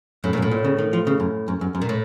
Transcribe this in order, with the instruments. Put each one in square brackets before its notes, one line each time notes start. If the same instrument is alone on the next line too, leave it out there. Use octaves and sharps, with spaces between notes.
[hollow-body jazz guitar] F#2 [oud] A2
[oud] A#2
[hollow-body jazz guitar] F#2
[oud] A2
[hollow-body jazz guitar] A#2
C#3
D#3
F3
C#3
F#2
F#2
F#2
F#2
[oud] A#2
A2